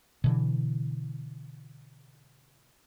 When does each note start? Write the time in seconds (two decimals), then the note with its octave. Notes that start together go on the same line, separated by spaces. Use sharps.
0.24 B2 D3 E3